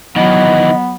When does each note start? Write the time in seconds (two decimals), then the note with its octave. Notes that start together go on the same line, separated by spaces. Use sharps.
0.16 D#3 E3 F#3 B3 D#5